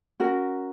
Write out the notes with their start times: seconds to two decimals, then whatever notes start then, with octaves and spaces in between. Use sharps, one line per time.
0.20 C#4 F#4 A#4